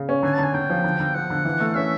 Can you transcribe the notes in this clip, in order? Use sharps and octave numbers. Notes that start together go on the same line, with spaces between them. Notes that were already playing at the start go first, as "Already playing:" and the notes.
Already playing: C#3
C#4
D3 G#5
D3 A5
G#5
D3 G5
F3
D3
D3
F3 F#5
D3
E3
A3
C#4 E5